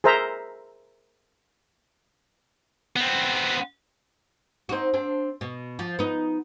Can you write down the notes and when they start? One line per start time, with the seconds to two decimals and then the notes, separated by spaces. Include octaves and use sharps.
0.04 G#4 A#4 C5 E5 A#5
2.96 B3 C4
4.69 C4 D#4 F#4
4.94 C4 D4
5.41 B2
5.79 F3
5.99 B3 D#4